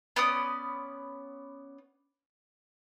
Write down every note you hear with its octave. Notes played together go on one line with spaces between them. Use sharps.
B3 C#4 D5 D#6